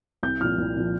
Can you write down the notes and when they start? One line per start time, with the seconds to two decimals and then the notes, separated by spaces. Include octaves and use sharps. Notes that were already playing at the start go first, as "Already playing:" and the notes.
0.23 C2 G6
0.41 A#2 F3 F6
0.58 C2
0.76 A#2 F3